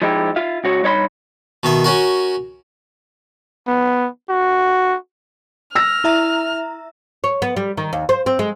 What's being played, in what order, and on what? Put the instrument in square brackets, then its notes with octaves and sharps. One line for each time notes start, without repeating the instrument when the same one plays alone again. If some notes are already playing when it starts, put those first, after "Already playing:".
[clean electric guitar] F3 G#3 D#4 E4 G4
F4 E5 F5
C#2 F#4 C#5
G2 D#4 C#5 D5 B5 C6
[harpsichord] B2 D#3 E5
C#4 F#4 A#4
[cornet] B3
F#4
[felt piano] E6 A#6 [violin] F6
[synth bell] E4 E5 A#5
[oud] C#5
B3
G3
D#3
D#2
C5
C4
G#3